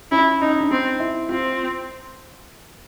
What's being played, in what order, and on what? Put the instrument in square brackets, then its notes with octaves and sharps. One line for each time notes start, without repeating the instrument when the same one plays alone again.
[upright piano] C#4 [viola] E4
[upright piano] C#4 [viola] D#4
[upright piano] D4
[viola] C4 [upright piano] D#4
[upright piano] E4
[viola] C4 [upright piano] F4